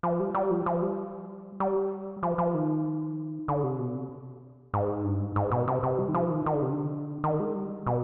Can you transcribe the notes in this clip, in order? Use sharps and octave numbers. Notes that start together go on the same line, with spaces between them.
F3
G3
G3
F3
F3
G3
G3
F3
F3
D#3
D3
C3
B2
C3
G#2
G2
G#2
G#2
B2
C3
C3
G3
D#3
F3
D#3
D#3
D3
C3
D3
D#3
G#3
G3
B2